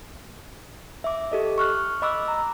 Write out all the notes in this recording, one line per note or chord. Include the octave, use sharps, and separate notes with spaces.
E5 D6
G4 A4 D#5
C#6 F6 F#6
D#5 B5 D6 E6 F#6
A#5